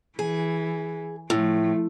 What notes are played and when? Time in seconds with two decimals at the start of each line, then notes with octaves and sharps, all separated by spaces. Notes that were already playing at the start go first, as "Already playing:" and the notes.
0.19 E3 G#4
1.30 A2 F3 A3